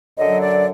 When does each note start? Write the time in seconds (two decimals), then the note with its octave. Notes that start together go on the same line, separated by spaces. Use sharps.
0.17 F#2 D3 F#3 D#5
0.42 D5